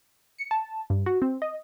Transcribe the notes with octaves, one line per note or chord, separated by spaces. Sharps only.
C#7
A5
G2
F#4
C4
D#5